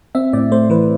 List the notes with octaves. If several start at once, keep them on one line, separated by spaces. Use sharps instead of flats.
C4 E5
A2 D5
A3 C5
E3 B4